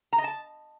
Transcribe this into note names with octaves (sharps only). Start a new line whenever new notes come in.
A#5
D#5
A5